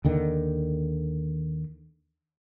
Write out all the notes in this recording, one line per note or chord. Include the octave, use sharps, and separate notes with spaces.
D#2 D3 D#3